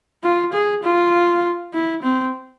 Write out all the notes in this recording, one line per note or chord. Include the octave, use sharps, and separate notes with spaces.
F4
G#4
F4
E4
C4